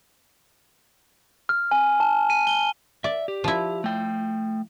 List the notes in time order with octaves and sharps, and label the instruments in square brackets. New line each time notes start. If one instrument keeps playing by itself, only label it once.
[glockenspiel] F6
G#5
A5
D#7
G7
[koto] D5 [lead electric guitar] E5
[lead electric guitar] G4
[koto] F3 E4
[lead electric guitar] A3 G5